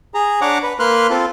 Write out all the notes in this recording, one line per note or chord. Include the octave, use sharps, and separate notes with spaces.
G#4 A#5
D4 C#5 F#5 A#5 D6
B4
A#3 B4 C6 F6 F#6
C4 F4 A4